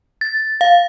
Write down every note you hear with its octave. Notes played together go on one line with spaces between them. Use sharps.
A6
F5